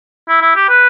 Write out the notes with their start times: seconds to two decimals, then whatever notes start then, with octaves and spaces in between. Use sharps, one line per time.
0.29 E4
0.41 E4
0.56 G4
0.69 B4